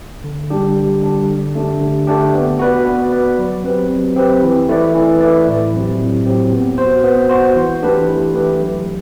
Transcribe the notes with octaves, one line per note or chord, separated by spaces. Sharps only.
D3
G3 D4 G4
D3
G3 D4 G4
D3
A3 D4 G4
D3
A3 D4 G4
B3
F#4 B4 D5
B3
F#4 B4 D5
F#3
C4 G4 B4
F#3
C4 G4 B4
E3
A3 E4 B4 D5
E3
A3 E4 B4 D5
A2
F#3 C4 G4
A2
F#3 C4 G4
B3
F#4 C5
B3
F#4 C5
E3
A3 D4 G4 B4
E3
A3 D4 G4 B4
F#3